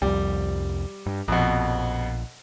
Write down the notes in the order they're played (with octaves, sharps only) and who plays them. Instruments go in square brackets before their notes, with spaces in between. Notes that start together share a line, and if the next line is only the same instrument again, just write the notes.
[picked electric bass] C2 F2 [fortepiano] G3
[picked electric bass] G2
[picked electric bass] A#1 [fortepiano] F2 B2